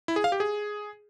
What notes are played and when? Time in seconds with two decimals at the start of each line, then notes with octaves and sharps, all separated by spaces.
0.08 E4
0.16 G#4
0.24 F5
0.32 G4
0.40 G#4